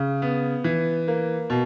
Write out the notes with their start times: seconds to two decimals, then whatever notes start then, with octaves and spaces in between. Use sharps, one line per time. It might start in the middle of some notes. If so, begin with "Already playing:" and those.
Already playing: C#3
0.22 B3
0.64 E3
1.08 A#3
1.50 B2